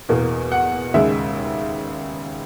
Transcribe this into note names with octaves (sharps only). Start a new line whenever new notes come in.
E2 B2 A#3
F#5
D#2 C#3 G#3 E5